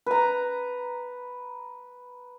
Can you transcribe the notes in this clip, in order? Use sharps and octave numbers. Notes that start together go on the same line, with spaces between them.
B4 A#5